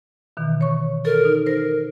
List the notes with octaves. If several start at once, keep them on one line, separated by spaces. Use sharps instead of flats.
B2 D#3 E3
C#5 C#6
A4 A#4
D#4
A#4 C5 A#6